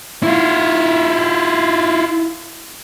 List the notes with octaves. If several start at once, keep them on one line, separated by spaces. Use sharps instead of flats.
E4 F4